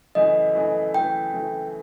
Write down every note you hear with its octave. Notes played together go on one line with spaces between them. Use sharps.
F#2 C#3 E3 A3 D#5
F#2 C#3 E3 A3
F#2 C#3 E3 A3 G5
F#2 C#3 E3 A3